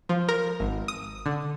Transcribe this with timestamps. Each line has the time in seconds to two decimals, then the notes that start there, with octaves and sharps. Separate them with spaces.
0.09 F3
0.29 A#4
0.60 G#1
0.88 D#6
1.26 D3